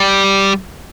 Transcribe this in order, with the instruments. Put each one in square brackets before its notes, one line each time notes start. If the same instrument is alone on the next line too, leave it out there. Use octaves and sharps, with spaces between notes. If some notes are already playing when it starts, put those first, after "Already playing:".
Already playing: [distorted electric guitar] G3